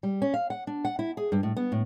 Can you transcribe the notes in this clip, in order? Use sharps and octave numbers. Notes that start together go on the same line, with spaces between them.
G3
C#4
F5
F#5
D4
F#5
E4
G#4
G2
A2
B3
A2